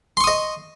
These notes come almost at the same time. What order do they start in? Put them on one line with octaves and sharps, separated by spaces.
C6 C#6 D#6 D#5